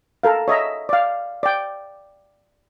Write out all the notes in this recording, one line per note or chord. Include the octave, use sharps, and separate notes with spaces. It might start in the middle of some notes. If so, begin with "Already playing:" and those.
A4 A#4 F5
C#5 D#5 E5 A#5
D5 F5
D5 G5